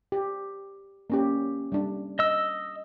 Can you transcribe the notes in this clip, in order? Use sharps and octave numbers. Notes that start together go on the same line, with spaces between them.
G4
A#3 C#4 G4
G3 D4
D#5 E6